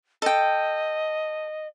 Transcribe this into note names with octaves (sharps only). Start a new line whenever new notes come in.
A4 D#5 G5